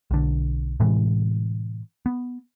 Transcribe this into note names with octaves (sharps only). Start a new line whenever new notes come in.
B1 D3
A2 C3 E3 G#3
B3